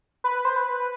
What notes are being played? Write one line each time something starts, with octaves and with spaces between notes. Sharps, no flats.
B4
C5
B4